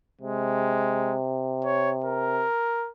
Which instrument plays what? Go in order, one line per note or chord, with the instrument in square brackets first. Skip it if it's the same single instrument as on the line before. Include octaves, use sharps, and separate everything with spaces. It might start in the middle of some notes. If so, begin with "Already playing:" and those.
[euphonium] C3 [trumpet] G#3
[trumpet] C#5
A#4